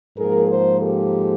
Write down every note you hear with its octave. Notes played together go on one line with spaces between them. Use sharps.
G#2 F3 A#3 G#4 A#4
A#4 C5
G4 A4